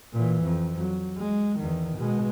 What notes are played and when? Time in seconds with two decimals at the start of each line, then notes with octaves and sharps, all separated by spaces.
0.14 A#2 E3
0.43 F2
0.78 F#3
1.18 G#3
1.59 E2 D#3
1.97 B2 G#3